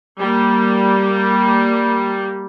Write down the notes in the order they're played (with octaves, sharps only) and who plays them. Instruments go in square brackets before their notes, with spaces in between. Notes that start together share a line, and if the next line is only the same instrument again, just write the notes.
[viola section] G3 A#3